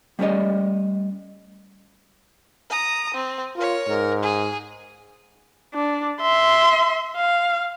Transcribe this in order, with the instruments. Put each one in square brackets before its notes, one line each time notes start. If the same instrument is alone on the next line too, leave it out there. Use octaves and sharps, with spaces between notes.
[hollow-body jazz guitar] G3 A3 C#4 G4 D5 D#5
[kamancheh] A#5 D#6
C4
[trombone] F4 [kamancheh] A#4 C#5
[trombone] G#2 [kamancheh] A#4
[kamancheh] G#4
D4
E5 C6
F5